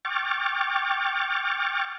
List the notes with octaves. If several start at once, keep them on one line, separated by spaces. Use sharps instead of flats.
G5 C#6 D6 F6 A6